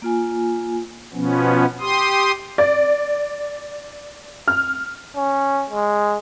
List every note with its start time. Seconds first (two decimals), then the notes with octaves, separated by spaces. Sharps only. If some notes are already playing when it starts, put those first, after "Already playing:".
0.02 A#3 F4 G#5
1.13 B2 F3 B3 C#4
1.80 G4 C6 D#6
2.58 D5
4.48 F6
5.17 C#4
5.70 G#3